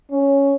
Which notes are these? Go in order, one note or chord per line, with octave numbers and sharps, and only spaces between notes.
C#4